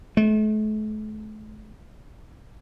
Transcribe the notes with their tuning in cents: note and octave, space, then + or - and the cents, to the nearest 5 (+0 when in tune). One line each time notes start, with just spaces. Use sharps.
A3 -40